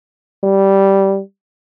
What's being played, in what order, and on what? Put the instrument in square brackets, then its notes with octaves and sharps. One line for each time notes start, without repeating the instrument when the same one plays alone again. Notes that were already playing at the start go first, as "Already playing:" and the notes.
[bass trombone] G3